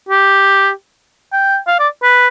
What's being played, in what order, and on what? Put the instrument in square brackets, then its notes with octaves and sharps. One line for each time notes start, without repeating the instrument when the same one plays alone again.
[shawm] G4
G5
F5
D5
B4